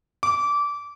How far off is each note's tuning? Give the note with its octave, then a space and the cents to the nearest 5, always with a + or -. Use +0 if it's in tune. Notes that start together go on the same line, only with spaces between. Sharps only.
D6 -20